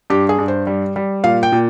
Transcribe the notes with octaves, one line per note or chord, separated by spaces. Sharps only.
G2 G4
G#4
G2
C5
G3
G3
A#2 F5
G5
A#2